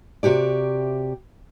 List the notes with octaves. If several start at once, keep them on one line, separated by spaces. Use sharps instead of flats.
C3 F#4 G4 D5